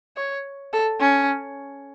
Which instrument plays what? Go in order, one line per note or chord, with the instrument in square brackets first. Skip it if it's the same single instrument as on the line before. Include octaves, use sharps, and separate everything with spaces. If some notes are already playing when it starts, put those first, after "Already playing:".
[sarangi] C#5
A4
C#4